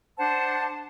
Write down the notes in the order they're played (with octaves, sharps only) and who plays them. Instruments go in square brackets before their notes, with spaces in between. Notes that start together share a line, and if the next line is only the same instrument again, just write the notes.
[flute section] D4 C5 F#5 A5